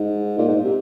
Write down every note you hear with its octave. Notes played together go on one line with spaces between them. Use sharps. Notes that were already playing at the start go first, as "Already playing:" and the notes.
Already playing: G#2
A#2
G#2
C3